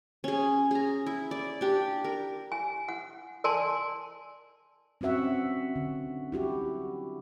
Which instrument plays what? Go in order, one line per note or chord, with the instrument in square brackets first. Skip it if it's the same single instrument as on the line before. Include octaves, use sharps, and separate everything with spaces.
[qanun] C#4 G#4
G#4 A#5
E4
D5
D4 G4
A#4
[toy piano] G#5
F#5
A#4 D5 G#5 A5 C6
[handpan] C4 C#4 F#4 E5 F#5
D3
E4 F#4 G4